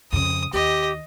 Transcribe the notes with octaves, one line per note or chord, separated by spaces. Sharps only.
F2 C#3 D#6
D#2 G4 D#5